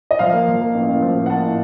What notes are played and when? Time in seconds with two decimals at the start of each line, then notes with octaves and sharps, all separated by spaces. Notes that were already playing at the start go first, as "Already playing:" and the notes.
0.11 D#5
0.19 F3 F5
0.33 A#3
0.47 F3
0.61 A#3
0.74 A1
0.89 A1
1.03 F3
1.16 A2
1.26 F#5
1.30 A#3 A5
1.44 A2